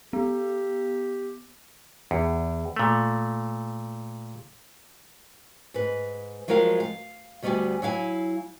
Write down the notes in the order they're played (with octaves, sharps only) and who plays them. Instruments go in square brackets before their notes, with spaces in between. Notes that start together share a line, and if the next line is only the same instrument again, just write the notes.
[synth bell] B3 [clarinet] G4
[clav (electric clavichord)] E2
A#2 A3
[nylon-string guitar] G#2 B4
F3 F#3 G#3 A#4 C5 F5
F5
D2 G3 B3 F#4 D5 G#5
F#3 E4 F5 G#5